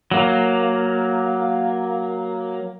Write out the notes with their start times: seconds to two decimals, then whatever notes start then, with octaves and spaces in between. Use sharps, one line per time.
0.11 F#3 A#3